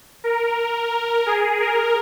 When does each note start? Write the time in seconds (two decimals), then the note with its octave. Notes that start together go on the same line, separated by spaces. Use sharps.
0.24 A#4
1.26 G#4
1.60 A#4